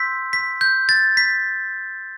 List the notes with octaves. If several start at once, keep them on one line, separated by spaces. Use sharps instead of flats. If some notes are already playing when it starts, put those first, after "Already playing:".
Already playing: C6 E6 G6 B6
B6
G6
A6
B6